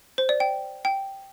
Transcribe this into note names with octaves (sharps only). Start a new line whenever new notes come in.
C5
D5
G5
G5